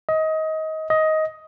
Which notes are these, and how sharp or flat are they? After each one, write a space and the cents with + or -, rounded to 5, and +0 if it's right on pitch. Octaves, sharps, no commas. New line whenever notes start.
D#5 +25
D#5 +15